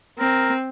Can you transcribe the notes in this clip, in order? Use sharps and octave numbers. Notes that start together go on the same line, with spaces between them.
C4 A#4